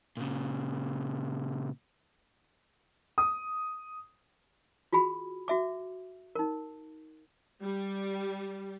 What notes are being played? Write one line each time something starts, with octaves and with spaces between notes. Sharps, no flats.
A#2 C#3
D#6
F4 F#4 G#4 B5
F#4 E5 D6
D#4 A#4
G3